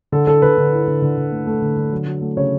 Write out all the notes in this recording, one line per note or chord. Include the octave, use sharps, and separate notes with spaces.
D3 A4
D3 A4
D3 B4
D3
E4
D3
D3
D3
A3
A3
D3
D3
F#3
F#3
A3
C#3 C#5